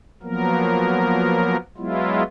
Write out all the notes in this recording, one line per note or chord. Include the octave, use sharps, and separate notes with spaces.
F3 F#3 A#3 B3 A#4
F#3 G#3 B3 E4 F4